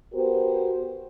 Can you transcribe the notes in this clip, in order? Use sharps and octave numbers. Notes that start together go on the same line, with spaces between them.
B3 F#4 G4 A#4 C5